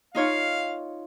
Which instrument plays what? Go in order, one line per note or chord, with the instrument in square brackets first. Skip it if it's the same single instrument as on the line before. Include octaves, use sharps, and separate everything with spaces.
[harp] D#4 F4 C#5 [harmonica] F5